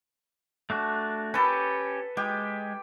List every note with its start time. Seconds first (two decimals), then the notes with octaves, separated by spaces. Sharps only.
0.70 A3 D4 F#4
1.34 C#4 G4 A4 B4
2.17 G#3 G4